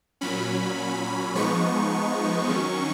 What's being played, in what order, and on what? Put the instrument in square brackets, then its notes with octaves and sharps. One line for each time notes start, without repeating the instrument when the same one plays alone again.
[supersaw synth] A#2 F#3 C#4 B5
F3 G#3 B3 D#4 C#6
D#3 F#3 C#4